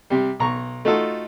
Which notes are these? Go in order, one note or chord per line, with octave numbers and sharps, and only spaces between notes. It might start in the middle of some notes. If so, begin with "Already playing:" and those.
C3 G3
B1 A#5 C#6
A3 D#4 F4 F#4 A4